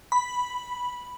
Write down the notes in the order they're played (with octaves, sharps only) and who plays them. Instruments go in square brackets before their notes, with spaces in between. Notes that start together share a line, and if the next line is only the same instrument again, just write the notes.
[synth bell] B5